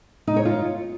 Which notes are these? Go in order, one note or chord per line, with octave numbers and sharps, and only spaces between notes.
D#4
C#5
F4